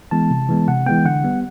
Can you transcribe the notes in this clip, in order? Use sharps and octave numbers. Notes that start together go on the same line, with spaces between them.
E3 G#3 B3 A5
C3
E3 G#3 B3
C3 F#5
E3 G#3 B3 G5
D3 F#5
G3 B3